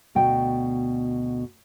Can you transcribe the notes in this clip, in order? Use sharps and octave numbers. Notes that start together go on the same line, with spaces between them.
D2 B2 G5